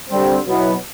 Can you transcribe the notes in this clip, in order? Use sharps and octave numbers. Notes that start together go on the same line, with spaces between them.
D3 G3 C4
B2 F#3 B3 E4